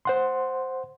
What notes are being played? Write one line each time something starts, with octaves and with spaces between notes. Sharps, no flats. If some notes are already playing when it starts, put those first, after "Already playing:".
C5 F#5 C6